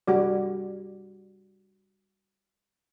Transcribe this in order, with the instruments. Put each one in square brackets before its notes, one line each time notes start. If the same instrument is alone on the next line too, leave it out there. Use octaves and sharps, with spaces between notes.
[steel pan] G3 F#4 D5